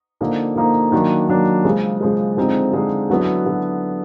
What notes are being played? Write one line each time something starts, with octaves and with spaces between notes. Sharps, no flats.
D3 F3 A#3 D#4
D3 F3 A#3 D#4
D#3 F#3 A#3 D4
D#3 F#3 A#3 D4
C#3 F3 G#3
C#3 F3 G#3
D3 F3 G#3 C4 D#4
D3 F3 G#3 C4 D#4
D3 F#3 B3 E4
D3 F#3